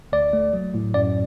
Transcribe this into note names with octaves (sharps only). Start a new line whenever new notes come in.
D2 D5
A3
F#3
A2
F#2 D5